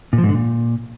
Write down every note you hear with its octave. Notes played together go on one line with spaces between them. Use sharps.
A#2
F3
G#2
D3
A#2